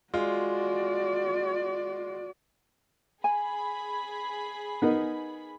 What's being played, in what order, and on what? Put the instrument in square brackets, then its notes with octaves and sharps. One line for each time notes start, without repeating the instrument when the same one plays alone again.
[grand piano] G#3 F4 [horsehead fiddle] F#4 D5
[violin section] G#4 B5 [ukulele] G#5
[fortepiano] B3 D#4 A#4